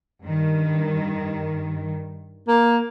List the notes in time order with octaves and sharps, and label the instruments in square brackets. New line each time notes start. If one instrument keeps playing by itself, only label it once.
[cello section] G2 D#3
[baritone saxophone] A#3